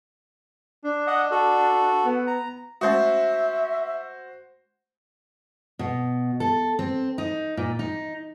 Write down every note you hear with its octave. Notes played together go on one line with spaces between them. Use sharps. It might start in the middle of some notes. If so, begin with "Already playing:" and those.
D4
D#5 F#5
F#4 A4
B3
A#5
G#3 A3 C#4 F#4 C5 E5
B2
A4
C4
D#4
A#2
D#4